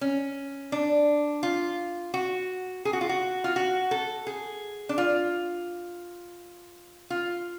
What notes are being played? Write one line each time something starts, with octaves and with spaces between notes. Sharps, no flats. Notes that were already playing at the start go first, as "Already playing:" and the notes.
C#4
D4
F4
F#4
G#4
F#4
F4
F#4
F4
F#4
A4
G#4
D4
F4
F4